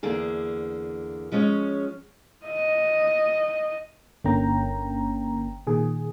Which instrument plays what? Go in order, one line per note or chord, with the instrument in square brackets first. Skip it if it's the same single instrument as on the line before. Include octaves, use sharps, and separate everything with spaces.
[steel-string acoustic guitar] E2 D3 A#3 G#4
F3 G#3 C#4 C#5
[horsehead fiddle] D#5
[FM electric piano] G1 D3 A#3 C#4 G5 A#5
A#2 D#3 G#4